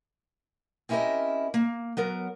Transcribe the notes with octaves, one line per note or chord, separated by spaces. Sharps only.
C4 C#4 E4 G4 A#4 D#5
A#3
F#3 B3 A#4